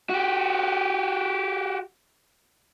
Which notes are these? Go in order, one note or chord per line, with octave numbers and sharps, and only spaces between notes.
F#4 G4